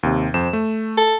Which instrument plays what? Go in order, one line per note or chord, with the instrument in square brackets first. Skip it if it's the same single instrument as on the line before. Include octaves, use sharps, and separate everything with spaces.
[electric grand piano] D#2 C3
F2 C5 E7
A3
[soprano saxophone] A4